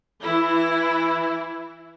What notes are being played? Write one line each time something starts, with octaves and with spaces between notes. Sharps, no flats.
E3 E4